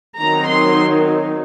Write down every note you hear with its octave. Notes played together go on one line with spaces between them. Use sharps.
D#3 F#3 C4 D#4 A#5
C6